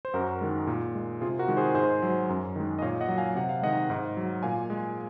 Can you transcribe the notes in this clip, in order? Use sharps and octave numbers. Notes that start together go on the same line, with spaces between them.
C5
F#2 F#4 A#4
D#3 G#3
A#2
G#3
C3 F4 G#4
F#4 A#4
D#3 G#3
G#4 C5
G#2 G#4 C5
F#3
F#2
D#3 G#3
D#5
A#2 C#5 F5
D#5 F#5
F#3
F5 G#5
C3 F#5
F5
D#3 G#3 D#5 F#5
G#2
F#3
A#2 F5 G#5
G#3